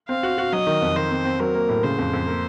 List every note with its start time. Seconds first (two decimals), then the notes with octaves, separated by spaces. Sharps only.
0.08 C4 F5
0.23 F#4
0.38 F#4
0.52 F#3 D#5
0.67 D#3
0.82 F2
0.96 D#3 C5
1.11 C4
1.25 C4
1.40 F#3 A#4
1.55 A#3
1.69 A2
1.84 C#3 C5
1.98 F2
2.13 F2
2.27 A#3